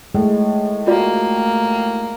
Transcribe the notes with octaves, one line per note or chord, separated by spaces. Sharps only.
A2 G#3
A#3 F4 F#4 D5